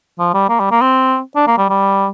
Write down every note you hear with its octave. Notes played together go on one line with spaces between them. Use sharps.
F3
G3
A#3
G3
A#3
C4
D4
A#3
G3
G3